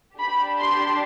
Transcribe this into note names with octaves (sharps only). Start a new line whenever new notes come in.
D4 G4 B5
C6